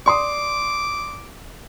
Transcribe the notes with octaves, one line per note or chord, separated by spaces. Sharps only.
D5 C6 D6 D#6